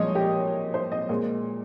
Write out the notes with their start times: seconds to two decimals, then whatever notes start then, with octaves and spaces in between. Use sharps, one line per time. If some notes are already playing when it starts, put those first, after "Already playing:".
Already playing: A#2 F3 G#3 C#5 D#5
0.15 G4
0.74 C5
0.92 D#5
1.09 A#2 G#3